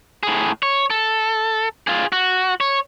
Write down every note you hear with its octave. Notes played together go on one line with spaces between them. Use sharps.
A2 G#4
C#5
A4
F4 G#4
F#4
C#5